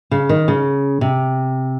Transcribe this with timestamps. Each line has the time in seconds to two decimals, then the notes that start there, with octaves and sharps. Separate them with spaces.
0.11 C#3
0.29 D#3
0.48 C#3
1.01 C3